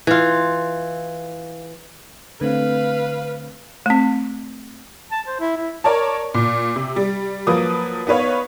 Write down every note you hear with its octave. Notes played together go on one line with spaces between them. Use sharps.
E3 F4
D3 A3 C4 B4 F5
A3 C4
A5
C5
E4
E4
A#4 C#5 D5 A5
A#2
C3
G3
F3 F#3 A#3 B4 D#6
B3 D#4 B4 C#5 F5